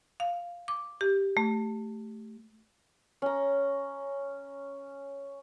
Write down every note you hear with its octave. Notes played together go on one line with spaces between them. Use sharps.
F5
D6
G4
A3
C#4 A#5